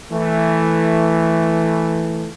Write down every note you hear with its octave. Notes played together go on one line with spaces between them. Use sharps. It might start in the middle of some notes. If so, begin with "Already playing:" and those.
E3 A3